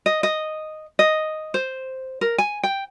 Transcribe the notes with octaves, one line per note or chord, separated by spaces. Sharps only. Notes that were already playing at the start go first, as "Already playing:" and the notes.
D#5
D#5
D#5
C5
A#4
G#5
G5